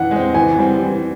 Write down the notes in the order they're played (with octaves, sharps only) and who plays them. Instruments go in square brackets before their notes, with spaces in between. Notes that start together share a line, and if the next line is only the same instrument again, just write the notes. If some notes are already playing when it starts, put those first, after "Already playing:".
Already playing: [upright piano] E3 [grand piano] F#5
[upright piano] G#3 C4
[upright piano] E3 [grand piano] G#5
[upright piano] G3 C4
E3